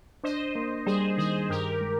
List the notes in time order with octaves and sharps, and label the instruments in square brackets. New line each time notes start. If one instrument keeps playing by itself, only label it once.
[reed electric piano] D4 [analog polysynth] C5 D#5
[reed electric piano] A#3
[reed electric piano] G3 [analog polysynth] G#4 C5
[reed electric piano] D#3 [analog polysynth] G#4 C5
[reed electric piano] G2 [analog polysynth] G4 A#4
[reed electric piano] G#3